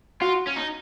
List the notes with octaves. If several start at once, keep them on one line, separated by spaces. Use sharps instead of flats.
F4 F#4
C#4
D#4